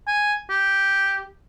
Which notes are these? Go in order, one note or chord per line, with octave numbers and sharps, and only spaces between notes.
G#5
G4